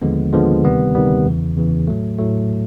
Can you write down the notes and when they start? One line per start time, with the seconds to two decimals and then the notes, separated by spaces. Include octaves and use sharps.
0.02 D#2 D3 F3 G#3 B3
0.33 D#2 D3 F3 G#3 B3
0.64 D2 C3 D#3 G3 B3
0.95 D2 C3 D#3 G3 B3
1.25 E2 C#3 E3
1.57 E2 C#3 E3
1.88 A2 F#3 A3
2.19 A2 F#3 A3